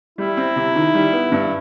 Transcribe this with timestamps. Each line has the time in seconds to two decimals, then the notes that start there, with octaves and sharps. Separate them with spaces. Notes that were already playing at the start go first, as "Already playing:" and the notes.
0.18 G3 E4
0.37 C4
0.56 C3
0.76 D#3
0.94 G3
1.12 B3
1.32 G2